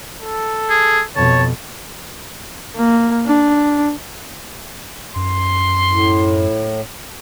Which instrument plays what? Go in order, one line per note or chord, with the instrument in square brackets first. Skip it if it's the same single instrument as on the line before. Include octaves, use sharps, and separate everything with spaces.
[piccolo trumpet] A4
[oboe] G#4
[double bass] F2 B2 [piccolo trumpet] C#5 [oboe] A5
[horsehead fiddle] A#3
D4
[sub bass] F#2 [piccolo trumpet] C6
[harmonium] A2